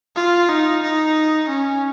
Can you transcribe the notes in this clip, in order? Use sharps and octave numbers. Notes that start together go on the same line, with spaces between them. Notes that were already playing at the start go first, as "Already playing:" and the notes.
F4
D#4
D#4
C#4